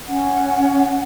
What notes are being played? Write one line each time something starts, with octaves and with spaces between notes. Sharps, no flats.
C#4 F#5